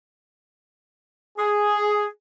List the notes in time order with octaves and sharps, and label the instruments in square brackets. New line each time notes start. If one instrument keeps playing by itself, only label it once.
[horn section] G#4